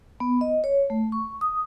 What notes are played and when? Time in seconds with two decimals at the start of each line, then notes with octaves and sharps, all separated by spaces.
0.20 B3
0.41 D#5
0.64 C#5
0.90 A3
1.12 C#6
1.41 D#6